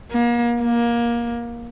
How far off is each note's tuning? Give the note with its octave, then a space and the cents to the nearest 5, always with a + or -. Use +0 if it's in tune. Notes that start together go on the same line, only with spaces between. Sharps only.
A#3 +35
A#3 +20